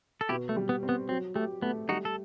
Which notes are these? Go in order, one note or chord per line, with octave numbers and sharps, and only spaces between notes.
A4
B2 E4 G4
A3
G3
B3
C4
B3
F#3 C4
A3 G4
A3 B3
G3 D#4 F#4
A4